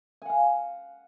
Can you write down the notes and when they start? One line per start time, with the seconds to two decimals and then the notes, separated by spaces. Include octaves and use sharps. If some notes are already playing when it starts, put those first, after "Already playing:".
0.22 G#5
0.26 F#5
0.29 F5